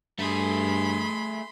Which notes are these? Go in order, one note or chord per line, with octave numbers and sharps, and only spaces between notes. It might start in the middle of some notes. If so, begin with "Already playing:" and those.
G2 A3 G#4 B5 C6